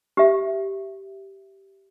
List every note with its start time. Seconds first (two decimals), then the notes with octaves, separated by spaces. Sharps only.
0.17 G4 E5